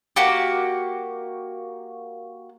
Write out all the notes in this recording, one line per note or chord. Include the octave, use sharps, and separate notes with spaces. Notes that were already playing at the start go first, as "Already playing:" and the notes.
A#3 F#4 G4